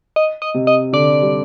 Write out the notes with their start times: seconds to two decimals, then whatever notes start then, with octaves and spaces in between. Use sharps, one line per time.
0.16 D#5
0.42 D#5
0.54 C3
0.67 D#5
0.93 D3 D5
1.22 G3